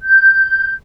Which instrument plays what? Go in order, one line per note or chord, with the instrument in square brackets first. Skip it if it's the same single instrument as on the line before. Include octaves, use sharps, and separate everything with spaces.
[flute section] G6